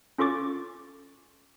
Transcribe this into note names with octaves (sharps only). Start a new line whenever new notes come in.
C#4 F4 A4 C#6 D6 A6